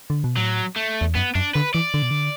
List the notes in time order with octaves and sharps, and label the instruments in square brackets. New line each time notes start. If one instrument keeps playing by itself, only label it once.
[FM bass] D3
B2
[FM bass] A2 [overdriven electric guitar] F#3
[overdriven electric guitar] A3
[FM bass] E2
[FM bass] F#2 [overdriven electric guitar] B3
[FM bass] F#2 [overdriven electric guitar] D4
[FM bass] D3 [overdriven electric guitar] B4
[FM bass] E3 [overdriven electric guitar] D5
[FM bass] D3
B2
D3